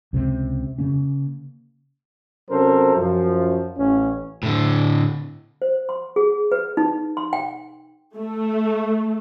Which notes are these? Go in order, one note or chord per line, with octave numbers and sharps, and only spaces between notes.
C#2 C3 D#3 C4
C#3 A#3 C#4
C3 F#3 C#4 A4 A#4 C5
F#2 F3
A1 C#4
A2 D3
C5
C6
G#4
B4
D#4
C6
G5
A3